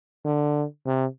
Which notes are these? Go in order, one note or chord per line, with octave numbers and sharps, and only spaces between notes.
D3
C3